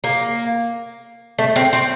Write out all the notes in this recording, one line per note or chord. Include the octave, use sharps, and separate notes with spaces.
A#3
A3
C4
C4